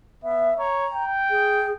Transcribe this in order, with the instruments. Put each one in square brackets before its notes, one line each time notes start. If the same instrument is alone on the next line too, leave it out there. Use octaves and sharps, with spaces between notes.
[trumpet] B3 [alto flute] E5
[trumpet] C#5 [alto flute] A#5
[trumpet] G5
[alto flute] G#4